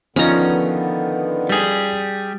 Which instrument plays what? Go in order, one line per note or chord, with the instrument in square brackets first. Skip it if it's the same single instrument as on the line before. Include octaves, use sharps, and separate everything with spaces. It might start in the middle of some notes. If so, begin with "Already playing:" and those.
[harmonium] D3 D#3 B3 [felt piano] F3 D#4 F4 [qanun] C#4 A#5
[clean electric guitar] G3 G#4